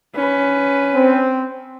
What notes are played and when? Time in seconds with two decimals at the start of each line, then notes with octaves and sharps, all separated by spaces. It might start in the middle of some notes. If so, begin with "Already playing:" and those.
0.15 C#4 B4
0.95 C4